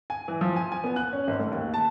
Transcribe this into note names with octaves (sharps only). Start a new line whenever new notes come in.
G#5
E3
F3
G#5
G#5
B3
F#6
C#4
G#1
A3
D#2
A5